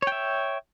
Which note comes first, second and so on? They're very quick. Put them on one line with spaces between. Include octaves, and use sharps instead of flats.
C#5 G5 E5